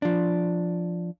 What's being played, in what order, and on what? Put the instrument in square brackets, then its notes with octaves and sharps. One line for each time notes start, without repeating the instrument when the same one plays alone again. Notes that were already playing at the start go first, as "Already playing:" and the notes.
[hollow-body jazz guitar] F3 D4